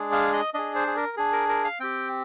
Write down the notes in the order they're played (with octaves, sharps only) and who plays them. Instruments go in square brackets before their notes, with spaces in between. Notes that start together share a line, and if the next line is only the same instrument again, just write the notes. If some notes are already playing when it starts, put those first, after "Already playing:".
Already playing: [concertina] G#3 D4 G#4
F5
D#5
D4 G#4 D#5
C5
G#4
A#4
D4 G#4
A#4
A#4
F5
C4 G4 G5